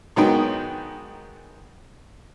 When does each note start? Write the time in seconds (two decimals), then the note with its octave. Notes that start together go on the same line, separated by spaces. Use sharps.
0.16 G#2 D#3 F#3 B3 D#4 G5